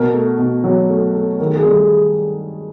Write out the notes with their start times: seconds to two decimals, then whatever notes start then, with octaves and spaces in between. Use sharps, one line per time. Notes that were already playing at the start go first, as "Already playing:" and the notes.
Already playing: B2 A#4
0.14 A3
0.38 B2
0.64 F#3
0.89 A3
1.14 A3
1.39 D#3 A#4
1.47 A4
1.55 G#4
1.63 G3 A4
1.77 G#4